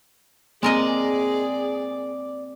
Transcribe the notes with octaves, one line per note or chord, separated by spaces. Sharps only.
G#3 A#3 C4 G#4 A#4 D5 D#5